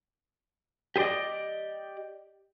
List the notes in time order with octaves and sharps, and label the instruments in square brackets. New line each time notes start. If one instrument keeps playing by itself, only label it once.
[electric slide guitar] G4 G#4 C5 D5 D#5